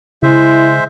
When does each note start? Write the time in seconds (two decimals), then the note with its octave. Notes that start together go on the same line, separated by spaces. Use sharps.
0.23 C#3 G#3 E4 C5 E5